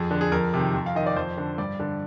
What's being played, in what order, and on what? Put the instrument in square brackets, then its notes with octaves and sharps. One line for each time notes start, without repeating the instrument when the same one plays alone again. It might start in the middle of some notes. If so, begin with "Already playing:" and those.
Already playing: [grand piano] F2 G#4
D3
G#4
F2 A#4
C3 D#3
F2
F5
D#3 D#5
D5
F2 C5
D3
G2 D5
D3